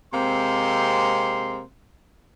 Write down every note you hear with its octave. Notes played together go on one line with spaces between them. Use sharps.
C3 G#3 A#3 C4 C6